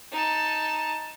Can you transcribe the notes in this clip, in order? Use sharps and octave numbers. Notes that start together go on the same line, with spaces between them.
D#4 A5